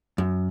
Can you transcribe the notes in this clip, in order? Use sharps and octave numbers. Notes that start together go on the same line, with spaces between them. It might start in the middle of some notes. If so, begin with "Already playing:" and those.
F#2